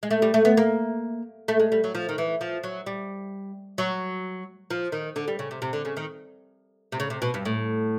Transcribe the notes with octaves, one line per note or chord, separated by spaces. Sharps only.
G#3
A3
G3
A3
B3
A#3
A3
G#3
G3
F#3
F3
D#3
E3
F3
F#3
G3
F#3
F3
D#3
D3
G3
C#3
C3
C3
D3
C#3
D#3
C3
C#3
C3
B2
G2
A2